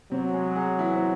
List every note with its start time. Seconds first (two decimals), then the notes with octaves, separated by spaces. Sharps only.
0.11 C3 F#3 C4
0.33 G#3 G#4
0.56 G#3 G#4
0.79 E3 E4
0.94 C4